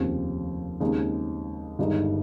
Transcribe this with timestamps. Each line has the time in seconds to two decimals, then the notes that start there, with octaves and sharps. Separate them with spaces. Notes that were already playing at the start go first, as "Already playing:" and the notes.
Already playing: F1 D#2 C#3 F3 C4
0.80 D#2 C#3 G#3 C4 D#4
1.79 G1 G2 D#3 G#3 D#4